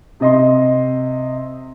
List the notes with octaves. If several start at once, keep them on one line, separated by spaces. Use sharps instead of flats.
C3 D#5 C6